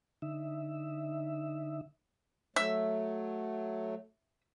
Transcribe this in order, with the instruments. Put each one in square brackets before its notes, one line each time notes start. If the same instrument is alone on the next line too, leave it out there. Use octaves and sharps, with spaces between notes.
[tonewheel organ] D3 D#4 E5
[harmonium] F#3 A3 [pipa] E5